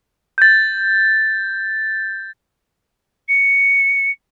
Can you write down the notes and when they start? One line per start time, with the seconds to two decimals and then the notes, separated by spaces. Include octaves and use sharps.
0.38 G6 A6
3.29 C#7